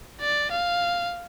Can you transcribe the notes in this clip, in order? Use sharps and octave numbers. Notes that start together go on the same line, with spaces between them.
D5
F5